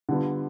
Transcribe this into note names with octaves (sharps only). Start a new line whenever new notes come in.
D3 G3 B3 D4 F4